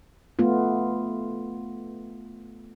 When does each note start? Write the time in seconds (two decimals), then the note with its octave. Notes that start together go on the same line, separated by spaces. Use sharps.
0.39 A3 B3 F4